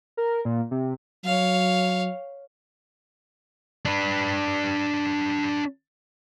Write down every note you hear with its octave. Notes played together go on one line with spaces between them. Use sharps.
A#4
A#2
C3
F#3 C#5 F5
D4 B4